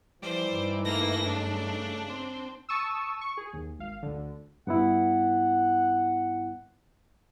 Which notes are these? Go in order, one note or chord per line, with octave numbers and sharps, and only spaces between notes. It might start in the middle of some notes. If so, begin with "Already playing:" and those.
E3 F3 G3 C5 D5
G2 D#4
A3 A#3 A#6
C#3 D4
C4
A5 C#6 D#6 E6
C#6
G#4
D#2
G#1 F5
D2 D3
G2 B3 E4 F#5